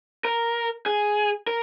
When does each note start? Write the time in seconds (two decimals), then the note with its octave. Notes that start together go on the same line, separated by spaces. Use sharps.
0.25 A#4
0.86 G#4
1.47 A#4